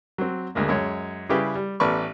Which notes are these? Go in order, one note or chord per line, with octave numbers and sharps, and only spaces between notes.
F#3 C4
D2 G#3 A#3
F#2 G#3 C#5
C#3 G3 E4 G4 G#4 B4
G3
A1 B3 D5 B5 C#6